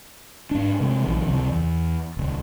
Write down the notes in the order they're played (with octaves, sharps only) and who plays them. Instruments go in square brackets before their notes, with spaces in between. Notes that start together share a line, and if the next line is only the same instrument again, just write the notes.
[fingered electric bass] G#2 D4
C3 G#3
A#1 D#3 F3
C#2 C3
E2
D#1 C#2